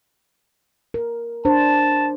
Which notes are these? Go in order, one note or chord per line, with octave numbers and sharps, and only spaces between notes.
A#4
D4 C5 A5